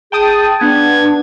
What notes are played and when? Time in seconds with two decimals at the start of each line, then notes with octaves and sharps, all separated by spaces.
0.12 G#4 G5 A5 D#6
0.61 B3 D4 G#6